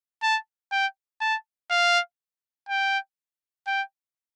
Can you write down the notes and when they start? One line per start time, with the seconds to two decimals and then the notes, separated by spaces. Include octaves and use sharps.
0.23 A5
0.72 G5
1.21 A5
1.70 F5
2.69 G5
3.67 G5